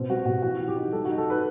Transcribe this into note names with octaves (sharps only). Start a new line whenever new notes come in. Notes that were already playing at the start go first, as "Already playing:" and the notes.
Already playing: B2 C4
G3 F#4
B2 F#4
E3 F#4
E3
G4
D#4
G3 A4
F#4
D#4
A4
D#4 B4